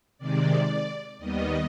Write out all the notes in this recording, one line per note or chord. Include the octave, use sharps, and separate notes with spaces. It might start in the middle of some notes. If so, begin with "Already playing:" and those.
C3 D#3 G#3 D5
D#2 D#3 G3 B3 D#5